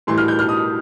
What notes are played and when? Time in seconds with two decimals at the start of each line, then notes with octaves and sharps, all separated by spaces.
0.07 A2 E3 G3 C6
0.18 F6
0.28 G6
0.39 F6
0.49 D#6